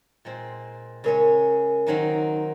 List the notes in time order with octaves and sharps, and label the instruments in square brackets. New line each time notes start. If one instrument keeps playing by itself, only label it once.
[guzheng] A#2 G#3 C4
[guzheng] C#3 G#3 C#4 [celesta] A#4
[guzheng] D#3 F#3 C4 D#4